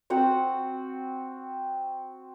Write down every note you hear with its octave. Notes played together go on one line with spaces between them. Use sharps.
C4 F#4 F#5